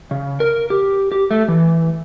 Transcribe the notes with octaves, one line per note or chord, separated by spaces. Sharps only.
C#3
A#4
G4
G4
A3
E3